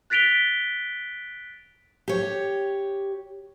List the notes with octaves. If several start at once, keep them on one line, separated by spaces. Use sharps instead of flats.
F#6 A6 B6 D7 F7 G7
G4 C#5